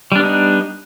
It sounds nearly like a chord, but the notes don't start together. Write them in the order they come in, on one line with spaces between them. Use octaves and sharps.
G3 D4 B3 D#4